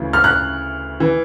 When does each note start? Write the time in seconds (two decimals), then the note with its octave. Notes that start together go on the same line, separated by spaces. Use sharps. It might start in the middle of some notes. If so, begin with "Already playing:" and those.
Already playing: D2 C#3 E3
0.13 F6
0.24 F#6
1.00 E3